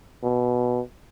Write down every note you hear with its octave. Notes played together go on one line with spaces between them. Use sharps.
B2